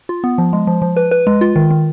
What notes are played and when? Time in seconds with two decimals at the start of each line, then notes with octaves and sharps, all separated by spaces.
0.09 F4
0.24 B3
0.38 F3
0.53 G#3
0.67 F3
0.82 F3
0.97 B4
1.11 B4
1.27 G#3
1.41 F4
1.56 D#3
1.70 D#3